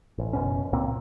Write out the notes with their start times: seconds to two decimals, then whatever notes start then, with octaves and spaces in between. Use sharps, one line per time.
0.18 A1
0.33 F#1 F#2 B2 C#4
0.73 C#2 A#2 A#3 C4